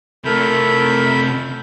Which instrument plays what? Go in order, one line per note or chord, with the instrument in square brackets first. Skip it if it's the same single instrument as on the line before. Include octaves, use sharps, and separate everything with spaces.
[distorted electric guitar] C3 A3 [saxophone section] E4 A#4 [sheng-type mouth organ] A4 B5 G6